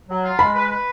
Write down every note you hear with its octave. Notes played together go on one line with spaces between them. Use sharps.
F#3
F4
G#3 B5
B4
B4